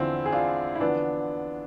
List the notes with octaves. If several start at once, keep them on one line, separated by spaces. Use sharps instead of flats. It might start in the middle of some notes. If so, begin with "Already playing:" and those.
Already playing: E2 D3 F3 C4 E4
G#4
D4 F4
E4
E2 D3 F3 B3 D4